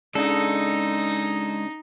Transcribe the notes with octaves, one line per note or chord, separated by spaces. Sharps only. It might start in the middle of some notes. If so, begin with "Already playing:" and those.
C#3 G#3 D4 D#4 A4